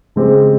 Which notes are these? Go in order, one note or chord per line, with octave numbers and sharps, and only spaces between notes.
C#3 G#3 C4 G4